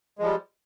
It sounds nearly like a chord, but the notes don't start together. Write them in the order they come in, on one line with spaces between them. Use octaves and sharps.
G#3 F3 G3